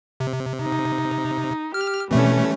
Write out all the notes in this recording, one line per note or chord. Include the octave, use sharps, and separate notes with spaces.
C3
D#4
G4 F6
B2 E3 G3 A3 C4 C#4